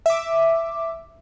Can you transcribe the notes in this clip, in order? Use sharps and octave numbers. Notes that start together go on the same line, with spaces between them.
E5 D6